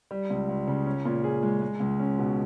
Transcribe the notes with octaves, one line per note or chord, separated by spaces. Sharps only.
G3
C#2
C#2
C#3
C#4
A#2
G#4
G#3
G#3
C#2
C#4
B2